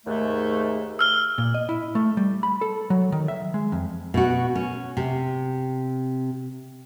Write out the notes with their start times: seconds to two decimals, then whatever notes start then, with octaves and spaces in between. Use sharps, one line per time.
0.06 D#2 G#2 A3
0.99 E6 F6 G7
1.38 A#2
1.54 D#5
1.69 E4
1.95 A3
2.17 G3
2.43 B5
2.61 A4
2.90 F#3
3.12 D#3
3.28 E5
3.54 G#3
3.72 F2
4.14 B2 F#4
4.55 C#4
4.97 C3